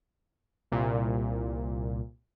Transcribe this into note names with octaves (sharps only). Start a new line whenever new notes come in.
C2 A#2